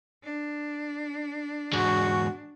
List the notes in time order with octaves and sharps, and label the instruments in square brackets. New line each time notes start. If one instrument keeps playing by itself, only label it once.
[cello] D4
[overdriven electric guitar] E2 G#2 [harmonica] F#4 [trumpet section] C#6